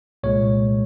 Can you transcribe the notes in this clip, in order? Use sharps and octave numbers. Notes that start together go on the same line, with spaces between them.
C2 A#2 G#3 C#5